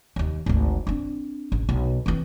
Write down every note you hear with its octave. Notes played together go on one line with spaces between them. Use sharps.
D#2 D#3
G#1 D2
C4 D4
A1
B1
E3 C4